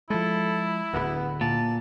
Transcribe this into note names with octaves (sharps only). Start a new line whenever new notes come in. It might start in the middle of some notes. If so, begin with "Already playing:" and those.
F3 G#3 E4 A4
D1 D2 B3
A#2 A5